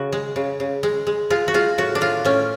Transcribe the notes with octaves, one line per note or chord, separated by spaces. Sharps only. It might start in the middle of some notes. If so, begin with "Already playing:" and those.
Already playing: C#3 F#4
G#3
C#3
C#3
G#3
G#3
G#3 F4
F#4
G#3 F4
A2 F#4
D4
A2 F4
A2 C#4